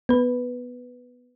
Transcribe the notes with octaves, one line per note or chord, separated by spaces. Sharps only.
B3 B4